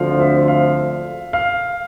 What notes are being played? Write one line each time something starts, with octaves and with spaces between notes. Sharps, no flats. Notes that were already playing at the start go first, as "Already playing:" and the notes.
Already playing: D2 D3 F3 C4 F5
E5
F5
F5